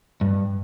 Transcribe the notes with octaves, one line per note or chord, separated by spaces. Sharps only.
G2